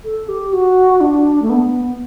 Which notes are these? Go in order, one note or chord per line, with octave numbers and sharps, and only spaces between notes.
A4
G4
F#4
D4
A3
B3